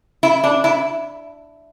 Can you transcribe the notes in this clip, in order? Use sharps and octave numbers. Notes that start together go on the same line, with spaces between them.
E4
D4
E4